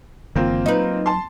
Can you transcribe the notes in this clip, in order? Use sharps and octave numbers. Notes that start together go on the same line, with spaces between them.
F#1 D3 E3 A#3 C4 F4
F#3 D#4 B4
A5 C6